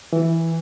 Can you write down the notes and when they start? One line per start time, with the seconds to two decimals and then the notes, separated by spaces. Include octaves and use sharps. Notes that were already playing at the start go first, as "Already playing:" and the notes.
0.13 E3